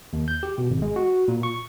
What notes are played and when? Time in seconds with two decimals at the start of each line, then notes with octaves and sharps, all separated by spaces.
0.13 D#2
0.28 G6
0.43 G4
0.58 B2
0.71 G#1
0.82 G#3
0.96 F#4
1.28 A#2
1.43 C#6